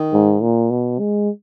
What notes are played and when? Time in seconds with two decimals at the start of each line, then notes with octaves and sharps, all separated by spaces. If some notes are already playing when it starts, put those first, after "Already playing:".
Already playing: D#3
0.13 G#2
0.42 A#2
0.71 B2
1.00 G#3